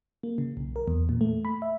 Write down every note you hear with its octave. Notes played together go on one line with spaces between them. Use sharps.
A#3
C#3
B1
A#4
E2
A#2
A3
B5
E5